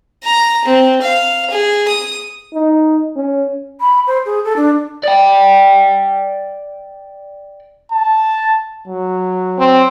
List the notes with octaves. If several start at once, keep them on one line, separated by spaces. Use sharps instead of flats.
A#5
C4
F5
G#4
D#6
D#4
C#4
B5
C5
G#4
A4
D4
D5 G5
A5
F#3
C4